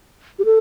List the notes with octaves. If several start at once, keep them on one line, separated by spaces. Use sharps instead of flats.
G4
A4